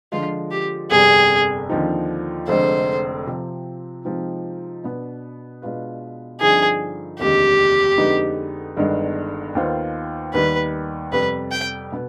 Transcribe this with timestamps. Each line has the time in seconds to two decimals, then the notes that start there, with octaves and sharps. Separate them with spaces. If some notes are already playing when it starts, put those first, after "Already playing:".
0.12 D3 F3 G#3 F4
0.51 G4
0.91 G1 F2 C3 G3 G#4
1.69 D#2 D3 F3 C4 D#4
2.48 F1 F2 D3 G#3 C5
3.27 C3 F3 C4
4.05 C3 F3 G#3 C4 D#4
4.84 B2 B3 D4
5.62 B2 G#3 D4 F4 B4
6.41 G2 D3 F3 C4 D#4 G#4
7.19 F1 D#2 D3 G#3 G4
7.98 F2 D3 G#3 B3 D#4
8.77 G1 G2 D#3 G#3 B3
9.55 D#2 D#3 B3 F4 C5
10.34 D#2 D#3 G3 B3 B4
11.12 F2 C3 G3 B3 B4
11.52 G5
11.92 B2 B3